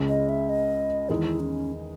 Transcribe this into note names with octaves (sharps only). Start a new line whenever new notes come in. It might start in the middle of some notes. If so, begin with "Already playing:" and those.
Already playing: C#2 C#3 G#3 C#4 G#4
D#5
E5
D#5
E2 D#3 G#3 D#4 E4
C#4